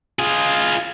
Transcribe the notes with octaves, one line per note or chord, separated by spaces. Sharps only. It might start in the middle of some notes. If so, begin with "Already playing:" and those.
F4 G#4